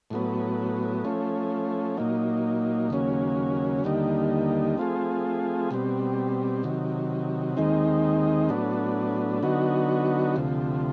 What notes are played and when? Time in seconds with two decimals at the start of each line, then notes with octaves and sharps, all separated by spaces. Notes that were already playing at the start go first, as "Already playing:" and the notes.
0.10 A2 F#3 B3
1.04 F3 A3 C#4
1.97 A#2 F#3 A#3 D#4
2.90 D#2 C#3 F#3 A#3 C#4
3.84 D#2 D3 G3 A#3 D#4
4.77 F3 A3 C4 F4 G#4
5.71 B2 G3 C4
6.63 C3 D#3 F#3
7.57 D#2 D#3 G#3 C4 D#4
8.49 A2 F#3 B3 D4
9.43 D3 F#3 B3 D#4 F#4
10.36 D2 C3 F3